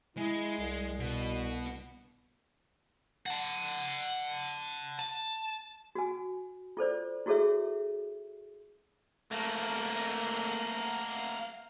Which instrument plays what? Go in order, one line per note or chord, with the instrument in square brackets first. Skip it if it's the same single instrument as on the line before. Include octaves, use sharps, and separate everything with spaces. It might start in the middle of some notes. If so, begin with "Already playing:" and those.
[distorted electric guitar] G#3 [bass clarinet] E4
[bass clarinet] C2
[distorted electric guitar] B2
[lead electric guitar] F#5 A5
A5
[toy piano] F#4 G#5
F4 A4 C5 D5
E4 F#4 G#4 A4 C#5 E5
[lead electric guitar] A3 A#3